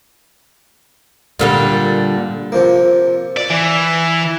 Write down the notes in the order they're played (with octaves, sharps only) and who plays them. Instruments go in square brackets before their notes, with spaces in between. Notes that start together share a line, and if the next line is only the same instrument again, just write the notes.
[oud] A#2 D3 G3
[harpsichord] C3 F3 A#3
[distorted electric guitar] D5
E3